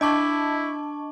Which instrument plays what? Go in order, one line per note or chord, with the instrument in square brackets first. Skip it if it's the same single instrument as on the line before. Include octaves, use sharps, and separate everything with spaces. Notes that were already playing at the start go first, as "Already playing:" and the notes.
[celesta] D4 D6 [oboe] E4 [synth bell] D#5 A5 C#6